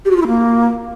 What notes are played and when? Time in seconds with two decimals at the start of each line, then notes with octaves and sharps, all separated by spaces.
0.05 G4
0.11 F#4
0.16 F4
0.22 E4
0.27 A#3